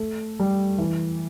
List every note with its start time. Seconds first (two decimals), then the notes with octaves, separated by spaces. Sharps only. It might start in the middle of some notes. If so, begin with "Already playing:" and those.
Already playing: A3
0.39 G3
0.78 E3